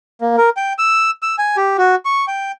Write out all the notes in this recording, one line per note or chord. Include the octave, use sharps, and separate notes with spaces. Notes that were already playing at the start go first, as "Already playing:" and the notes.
A#3
A#4
G5
E6
E6
G#5
G4
F#4
C#6
G5